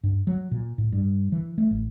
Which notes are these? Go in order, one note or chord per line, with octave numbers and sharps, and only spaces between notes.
G2
F#3
A#2
A2
G2
E3
A3
A1